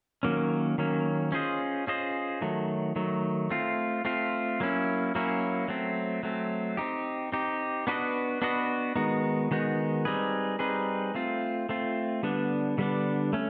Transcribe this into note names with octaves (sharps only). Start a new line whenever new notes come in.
D#3 F#3 A#3 C#4
D#3 F#3 A#3 C#4
C#4 F4 G#4 C5 D#5
C#4 F4 G#4 C5 D#5
D#3 F#3 A3
D#3 F#3 A3
A3 C4 F4
A3 C4 F4
F#3 A#3 C#4 E4
F#3 A#3 C#4 E4
F#3 A3 C4
F#3 A3 C4
C4 D#4 G4
C4 D#4 G4
B3 D4 F#4 B4 D#5
B3 D4 F#4 B4 D#5
D#3 G#3 B3 D#4 F#4
D#3 G#3 B3 D#4 F#4
G3 C4 D#4 G#4 B4
G3 C4 D#4 G#4 B4
A3 C4 F4
A3 C4 F4
D3 G3 B3 D4
D3 G3 B3 D4
A3 C#4